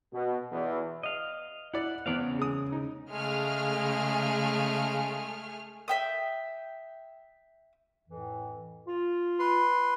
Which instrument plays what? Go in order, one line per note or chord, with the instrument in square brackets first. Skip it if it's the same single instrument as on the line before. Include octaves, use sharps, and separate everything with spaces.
[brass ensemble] B2
E2
[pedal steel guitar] D#5 F5
[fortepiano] E4 D5 [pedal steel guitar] F#5
[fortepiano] E2 B3 C4 [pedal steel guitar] D5 F5
[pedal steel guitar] C#3
[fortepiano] G#3 D#6
D#4
[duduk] C#3 [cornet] G#3 [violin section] A3 G#4 F6
[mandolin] E5 G5 D#6
[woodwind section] F2 A2 E3
F4
[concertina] B4 C6